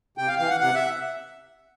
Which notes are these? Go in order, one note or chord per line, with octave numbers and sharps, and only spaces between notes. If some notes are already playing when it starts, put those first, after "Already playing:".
C3 G5
F5
E3 F5
F#5
C3 F#5
E5